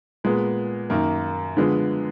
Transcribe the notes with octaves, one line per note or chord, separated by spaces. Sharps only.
A#2 G#3 B3
F#2 D#3 A#3
D3 F3 G#3 B3